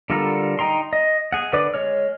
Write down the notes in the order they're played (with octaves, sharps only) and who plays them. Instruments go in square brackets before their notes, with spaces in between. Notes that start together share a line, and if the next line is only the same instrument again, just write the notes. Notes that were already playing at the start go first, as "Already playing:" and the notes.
[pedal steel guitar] D3 G3 F4 A4 A#4
D#4 G5 A#5 C6
D#5
G#4 F#5
D3 B4 D5 D6 F#6
G#3 C#5 F6